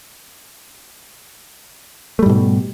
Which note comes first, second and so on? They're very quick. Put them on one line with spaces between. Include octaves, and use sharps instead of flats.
A3 G3 G#2 B2